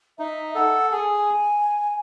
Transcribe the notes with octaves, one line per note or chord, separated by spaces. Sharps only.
D#4 E5
A4 F#5
G#4 G#5
G#5